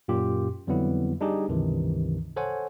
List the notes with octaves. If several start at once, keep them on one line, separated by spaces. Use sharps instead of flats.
F#2 A#2 F4 G4
F2 D3 F#3 G3 B3 E4
G3 D4 D#4 G4 G#4
C#2 G2 C3 D#3 E3
A4 C5 C#5 F#5 G#5